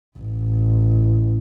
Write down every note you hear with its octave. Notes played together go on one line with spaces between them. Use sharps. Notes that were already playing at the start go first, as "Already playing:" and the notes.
A1